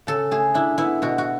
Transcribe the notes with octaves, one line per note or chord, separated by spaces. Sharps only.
C#3 A4
A3 G#4
D4 E4
B3 E4
B2 F#4
F#4